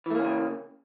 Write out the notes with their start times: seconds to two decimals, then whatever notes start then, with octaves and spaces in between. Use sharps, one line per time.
0.06 E3
0.10 A3
0.15 A#3
0.19 C#4
0.24 C#3